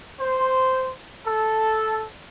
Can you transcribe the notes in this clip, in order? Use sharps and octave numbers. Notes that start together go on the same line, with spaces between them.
C5
A4